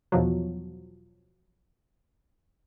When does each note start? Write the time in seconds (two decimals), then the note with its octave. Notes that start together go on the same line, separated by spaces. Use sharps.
0.12 E2 B2 F3 F#3